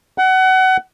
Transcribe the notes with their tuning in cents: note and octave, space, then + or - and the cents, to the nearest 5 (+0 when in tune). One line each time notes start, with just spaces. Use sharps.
F#5 +25